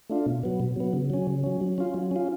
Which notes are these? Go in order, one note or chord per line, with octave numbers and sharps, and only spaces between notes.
A3 D4 F4
B2
F#3 B3
B2
F#3 B3
C#3
F#3 C#4
C#3
F#3 C#4
F#3
C#4 F4
F#3
C#4 F4